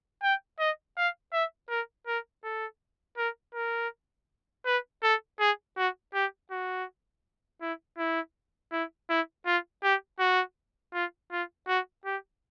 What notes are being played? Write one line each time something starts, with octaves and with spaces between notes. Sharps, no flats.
G5
D#5
F5
E5
A#4
A#4
A4
A#4
A#4
B4
A4
G#4
F#4
G4
F#4
E4
E4
E4
E4
F4
G4
F#4
F4
F4
F#4
G4